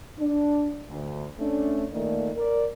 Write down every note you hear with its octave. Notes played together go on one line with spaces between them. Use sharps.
D4
D2
A3 C#4 D4
A#2 D#3 A3 A#3 A4 D5
A#4 D5